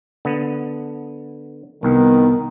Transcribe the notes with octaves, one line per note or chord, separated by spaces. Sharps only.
D3 B3
C2 D#3 B3